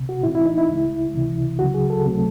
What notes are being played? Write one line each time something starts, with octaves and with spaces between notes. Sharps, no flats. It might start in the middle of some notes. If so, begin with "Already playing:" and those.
Already playing: C2 C3
F#4
A2 E3 C4 E4
E4
D#4
E4
C#2 C#3 G#3
C#2 C3 E3
C#2 C#3 F#3 F#4
G#4
A4
C#2 C3 F#3 A3 C4